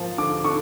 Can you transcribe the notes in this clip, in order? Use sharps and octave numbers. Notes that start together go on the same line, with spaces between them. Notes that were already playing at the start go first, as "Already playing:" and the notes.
Already playing: G#2 F3 A#3
D3 D6
D3 C#6